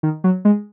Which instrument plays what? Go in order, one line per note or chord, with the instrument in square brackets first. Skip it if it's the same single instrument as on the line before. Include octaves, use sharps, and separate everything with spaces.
[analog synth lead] D#3
F#3
G#3